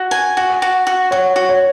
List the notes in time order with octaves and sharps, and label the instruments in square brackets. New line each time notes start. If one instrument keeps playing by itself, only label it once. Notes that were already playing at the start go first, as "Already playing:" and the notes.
Already playing: [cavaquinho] F#4
G#5
F#4
F#4
F#4
[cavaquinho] F#4 [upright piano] C#5
[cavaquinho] F#4
[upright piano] C#5